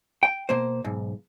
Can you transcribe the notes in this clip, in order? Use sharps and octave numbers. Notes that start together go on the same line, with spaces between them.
G5
B2 A#3 C5
B1 G#2